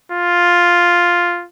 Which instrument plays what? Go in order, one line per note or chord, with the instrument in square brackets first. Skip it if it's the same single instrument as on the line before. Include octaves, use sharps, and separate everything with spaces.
[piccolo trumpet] F4